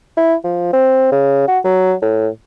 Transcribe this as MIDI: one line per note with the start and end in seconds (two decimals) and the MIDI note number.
0.17 0.34 64
0.44 0.69 53
0.73 1.11 60
1.12 1.43 49
1.48 1.59 66
1.64 1.94 54
2.02 2.28 45